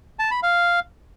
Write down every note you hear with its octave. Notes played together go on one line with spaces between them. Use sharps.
A5
B5
F5